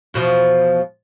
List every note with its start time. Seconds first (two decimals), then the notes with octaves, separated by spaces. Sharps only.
0.14 E2 B2 F3